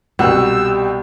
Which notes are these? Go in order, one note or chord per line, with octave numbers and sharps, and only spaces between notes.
C2 B2 G4 F#5 E6